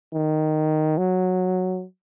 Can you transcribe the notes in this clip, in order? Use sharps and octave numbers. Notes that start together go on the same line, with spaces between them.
D#3
F#3